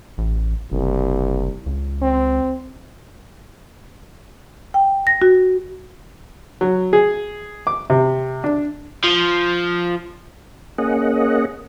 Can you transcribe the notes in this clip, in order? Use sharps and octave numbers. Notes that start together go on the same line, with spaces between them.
A1
F#1 C2
C#2
C4
G5
A#6
F#4
F#3
G#4
D6
C3
D4
F3
A#3 C#4 G#4 D#5 F#5